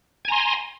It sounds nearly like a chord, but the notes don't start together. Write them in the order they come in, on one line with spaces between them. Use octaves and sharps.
G#5 A#5 C6